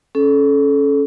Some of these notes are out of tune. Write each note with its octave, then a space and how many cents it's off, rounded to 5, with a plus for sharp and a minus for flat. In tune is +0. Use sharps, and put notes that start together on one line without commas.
C#4 +0 A4 -25